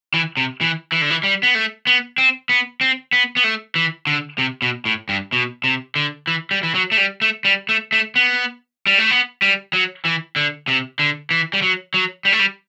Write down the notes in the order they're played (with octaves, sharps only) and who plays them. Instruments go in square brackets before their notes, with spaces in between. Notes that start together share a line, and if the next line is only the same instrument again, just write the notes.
[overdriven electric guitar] E3
C3
E3
E3
D3
E3
G3
B3
A3
B3
C4
B3
C4
B3
B3
A3
E3
D3
C3
B2
A2
G2
B2
C3
D3
E3
G3
E3
F#3
A3
G3
A3
G3
A3
A3
B3
G3
A3
B3
G3
F#3
E3
D3
C3
D3
E3
G3
F#3
F#3
G3
A3
G3